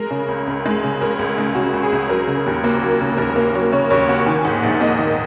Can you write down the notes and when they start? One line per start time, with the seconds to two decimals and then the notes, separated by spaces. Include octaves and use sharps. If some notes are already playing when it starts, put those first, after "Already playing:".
Already playing: G#3 A#4
0.11 C#3
0.28 C#2
0.47 C#2
0.66 G#3
0.84 C#3
1.01 C#2 A#4
1.19 C#2
1.38 G#3
1.55 C#3 F#4
1.73 C#2
1.83 G#4
1.92 C#2
2.09 F#3 A#4
2.27 C#3
2.46 D#2
2.64 A#3
2.82 F#3
3.01 C#3
3.18 D#2 A#4
3.36 A#3 A#4
3.54 F#3 C#5
3.72 C#3 C#5
3.90 D#2 C#5
4.08 A#3 F#5
4.26 D#3 G#5
4.45 G#2 F#5
4.62 A#1 F#5
4.81 A#3 D#5
4.99 D#3